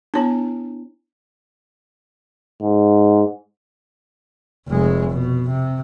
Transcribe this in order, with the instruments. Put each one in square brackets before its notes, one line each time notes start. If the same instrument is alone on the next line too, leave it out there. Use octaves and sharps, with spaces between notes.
[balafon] B3 C#5 A5 [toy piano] D4 E4
[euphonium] G#2
[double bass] F1 G#3
B2
C3